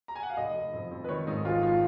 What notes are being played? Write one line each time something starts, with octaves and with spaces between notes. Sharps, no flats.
A#5
G#5
F#5
F5
F1 D#5
F1
F2
F2
B4
D#3 C#5
G#2 D#4
G#1 F4
F4